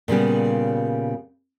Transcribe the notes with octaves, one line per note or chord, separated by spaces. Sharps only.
A#2 C#3 G3 B3